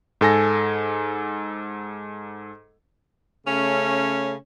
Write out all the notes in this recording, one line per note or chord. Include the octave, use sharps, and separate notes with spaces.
G#2 A4 G#5 A#6
C#3 A3 C#4